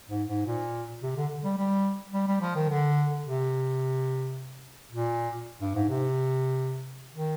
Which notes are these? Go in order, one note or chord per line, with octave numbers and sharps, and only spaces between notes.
G#2
G#2
A#2
C3
D3
G3
G3
G3
G3
F3
D#3
D3
C3
A#2
G2
G#2
C3
D#3